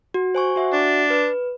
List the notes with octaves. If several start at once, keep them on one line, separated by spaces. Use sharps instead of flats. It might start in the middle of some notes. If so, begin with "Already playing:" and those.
F#4
C5 G#5 C#6
F#4 E5 F#5
D4
B4